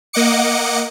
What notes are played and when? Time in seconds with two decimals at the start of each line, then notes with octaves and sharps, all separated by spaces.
0.13 A#3 D#5 F#5 D6 C#7